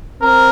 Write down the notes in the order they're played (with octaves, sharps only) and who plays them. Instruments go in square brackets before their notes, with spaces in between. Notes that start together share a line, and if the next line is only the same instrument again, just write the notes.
[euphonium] C4 [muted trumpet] A#4